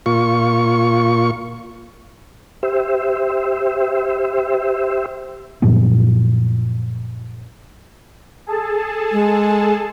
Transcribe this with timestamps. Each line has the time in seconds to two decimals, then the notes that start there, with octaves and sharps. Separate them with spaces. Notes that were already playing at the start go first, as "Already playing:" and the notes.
0.06 A#2 F4 C#6
2.63 G4 C5 E5
5.62 F#2 A#2 F3 B3
8.47 G#4 A4 A5
9.12 G#3